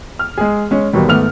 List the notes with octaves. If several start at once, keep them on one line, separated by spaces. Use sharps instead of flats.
F6
G#3 G#4
G#3 C#4
D#2 B2 F#3 G3
G#1 A3 B3 F6 F7